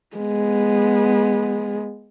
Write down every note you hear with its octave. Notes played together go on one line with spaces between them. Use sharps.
G#3 B3